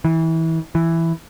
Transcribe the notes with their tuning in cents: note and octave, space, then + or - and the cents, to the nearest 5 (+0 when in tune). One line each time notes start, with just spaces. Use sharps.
E3 -25
E3 +5